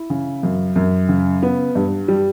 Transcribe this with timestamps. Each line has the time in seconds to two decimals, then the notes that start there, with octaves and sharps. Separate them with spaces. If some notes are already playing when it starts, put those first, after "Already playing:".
Already playing: E4
0.10 C#3
0.43 F#2
0.76 F#2
1.09 C#3
1.43 B3
1.75 G2
2.08 G3